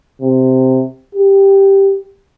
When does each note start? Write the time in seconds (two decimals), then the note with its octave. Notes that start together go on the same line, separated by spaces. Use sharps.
0.21 C3
1.15 G4